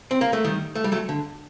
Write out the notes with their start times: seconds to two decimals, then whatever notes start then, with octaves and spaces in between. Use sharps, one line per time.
0.11 C4
0.21 A#3
0.33 A3
0.44 D#3 G3
0.75 A3
0.84 G3
0.92 F#3 A3
1.09 D3